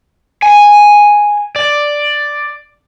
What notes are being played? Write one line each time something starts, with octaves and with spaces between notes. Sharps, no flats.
G#5
D5